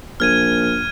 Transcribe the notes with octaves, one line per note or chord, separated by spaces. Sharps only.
A#1 F6 G#6 D#7